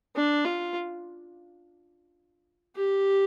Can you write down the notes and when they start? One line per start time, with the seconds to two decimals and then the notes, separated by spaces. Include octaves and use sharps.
0.16 D4
0.44 F4
2.76 G4